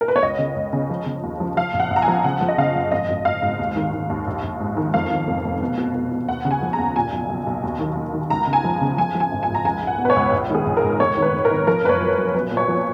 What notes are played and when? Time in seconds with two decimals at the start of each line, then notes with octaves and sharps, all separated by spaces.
0.01 A#4
0.08 B4
0.16 C#5
0.22 C#2 D#5
0.39 C#3
0.56 C#2
0.73 C#3
0.90 F3
1.06 C#3
1.23 D#2
1.40 F3
1.57 F3 F5
1.73 A#1
1.80 F#5
1.90 A#1
1.96 A#5
2.02 G#5
2.08 F3
2.24 C#3 F#5
2.41 F3
2.48 D#5
2.58 C#3 F5
2.75 F#1
2.92 G#1 D#5
3.09 G#1
3.25 G#1 F5
3.42 G#2
3.59 D#2
3.76 D#3
3.93 D#3
4.10 D#2
4.27 A#1
4.43 A#1
4.60 G#2
4.77 D#3
4.94 F2 F5
5.11 D#3
5.27 F1
5.44 F1
5.61 B2
5.78 B2
5.95 B2
6.11 B2
6.28 D#2 F#5
6.45 C#3
6.51 G#5
6.62 F3
6.73 A#5
6.79 D#2
6.96 A#2 G#5
7.12 B1
7.29 B1
7.46 B1
7.63 D#2
7.80 D#3
7.97 D#2
8.14 D#3
8.30 C#2 A#5
8.47 C#3
8.53 G#5
8.64 F3
8.81 C#3
8.97 F3 G#5
9.15 F3
9.20 G#5
9.31 G#1
9.43 G#5
9.48 G#2
9.55 A#5
9.64 C#2 G#5
9.82 C#2
9.87 F#5
9.98 B2
10.05 B4
10.10 C#5
10.16 C#2
10.32 A#1
10.50 D#3 G#4
10.66 A#1
10.77 A#4
10.83 G#2
11.00 F1 C#5
11.17 D#3
11.22 B4
11.33 F1
11.45 A#4
11.50 D#3
11.67 F3 A#4
11.84 F#1 B4
11.89 C#5
12.01 F#2
12.18 F#2
12.34 B1 B4
12.51 A#2
12.57 C#5
12.68 F3